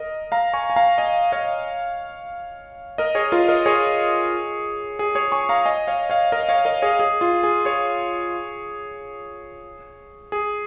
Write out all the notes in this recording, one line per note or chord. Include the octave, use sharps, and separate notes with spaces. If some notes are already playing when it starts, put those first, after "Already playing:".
Already playing: A#4 D#5
F5 A#5
G#5 C#6
G#5
F5 A#5
D#5 G#5
C#5 F5
A#4 D#5
G#4 C#5
F4 A#4
A#4 D#5
G#4 C#5
G#4
G#4 C#5
G#5 C#6
F5 A#5
D#5 G#5
C#5 F5
C#5 F5
A#4 D#5
C#5 F5
A#4 D#5
G#4 C#5
G#4
F4
G#4
G#4 C#5
G#4